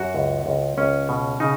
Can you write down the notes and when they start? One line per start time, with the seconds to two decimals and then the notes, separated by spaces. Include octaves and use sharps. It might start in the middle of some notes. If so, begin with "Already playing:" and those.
Already playing: F#2 F#4
0.15 C#2
0.46 C#2
0.77 C#2 C#4
1.09 B2
1.40 C#3 D#4